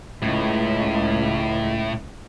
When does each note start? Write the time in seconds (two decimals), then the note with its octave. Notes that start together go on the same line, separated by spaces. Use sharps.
0.22 C#2 A2